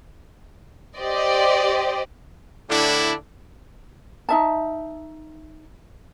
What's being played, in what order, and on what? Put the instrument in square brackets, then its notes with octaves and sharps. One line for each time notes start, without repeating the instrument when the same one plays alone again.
[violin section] G4 C5 D5 D#5
[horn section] A2 D3 D4 E4
[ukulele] D#4 E5 A5